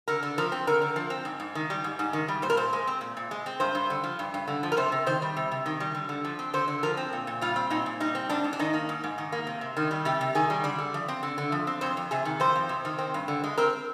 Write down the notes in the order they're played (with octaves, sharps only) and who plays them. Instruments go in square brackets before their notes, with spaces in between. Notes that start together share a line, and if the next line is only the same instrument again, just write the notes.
[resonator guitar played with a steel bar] D3 A#4
D3
F3 A#4
C4
D3 A#4
D3
F3
C4
G#2
G#2
D#3
G3
G#2
G#2
D#3
G3
A#2 C5
A#4
A#2 C5
G#3
C4
A#2
A#2
G#3
C4
G2 C5
G2
D3
F3
G2
G2
D3
F3
A#4
C3 C5
C3
D#3 C5
G3
C3
C3
D#3
G3
D3
D3
F3
C4
D3 C5
D3
F3 A#4
C4
A#2
A#2
G3 F4
C4
A#2 D#4
A#2
G3 D#4
C4
G#2 D4
G#2
D4
D#3 D#4
A#3
G#2
G#2
D#3
A#3
C3
C3
D#3
G3
C3 G4
C3
D#3 G#4
G3
D3 D5
D3
F3
C4
D3
D3
F3
C4
F2 C5
F2
C3 G#4
D#3
F2 C5
F2
C3
D#3
C4
G2
D3
G#3
C4 A#4